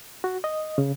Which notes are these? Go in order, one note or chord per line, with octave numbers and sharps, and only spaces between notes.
F#4
D#5
C#3